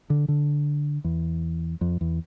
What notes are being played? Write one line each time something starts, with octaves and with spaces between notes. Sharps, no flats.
D3
D3
E2
F2
E2